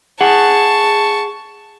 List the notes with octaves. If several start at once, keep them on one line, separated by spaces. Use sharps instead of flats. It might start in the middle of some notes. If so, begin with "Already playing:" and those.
G#4 F#5 A5 C#6